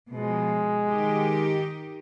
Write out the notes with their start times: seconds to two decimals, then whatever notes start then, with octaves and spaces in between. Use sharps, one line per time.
0.11 B2 F3 G#3
0.89 D#3 D#4 G4